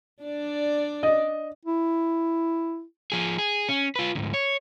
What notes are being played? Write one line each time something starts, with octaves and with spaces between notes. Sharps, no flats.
D4 D5
D#5
E4
F3 G#4
G#4
C#4
F4 B4
D2 G#2
C#5